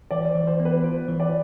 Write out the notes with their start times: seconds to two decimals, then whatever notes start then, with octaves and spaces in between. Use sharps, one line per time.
0.11 E3 D5
0.29 C5
0.35 E3
0.47 C5
0.60 B3
0.65 B4
0.83 F4 C5
1.08 E3
1.20 D5